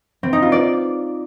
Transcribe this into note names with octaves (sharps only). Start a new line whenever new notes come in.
C4
D#4
F4
D5